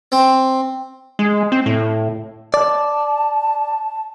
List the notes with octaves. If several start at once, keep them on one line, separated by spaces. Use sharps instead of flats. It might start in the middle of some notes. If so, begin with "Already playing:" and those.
C4
G#3
C4
A2
D5 A5